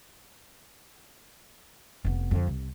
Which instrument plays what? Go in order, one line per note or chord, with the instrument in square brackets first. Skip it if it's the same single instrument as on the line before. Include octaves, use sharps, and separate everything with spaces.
[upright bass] F1 B3
F2 D3
C2